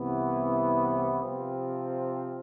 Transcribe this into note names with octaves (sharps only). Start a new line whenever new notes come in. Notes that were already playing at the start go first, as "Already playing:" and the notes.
Already playing: C2 C3 E3 B3 E4
C3 F3 C4